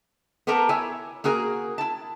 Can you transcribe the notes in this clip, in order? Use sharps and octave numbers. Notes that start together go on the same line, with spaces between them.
B3 G4 A4 A#4 A#5
E4 C#5 G#5
A#3 F#4 G#4 A#4
E4 A5